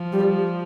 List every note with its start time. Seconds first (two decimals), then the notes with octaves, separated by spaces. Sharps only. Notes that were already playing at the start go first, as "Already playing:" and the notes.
Already playing: F3
0.13 G3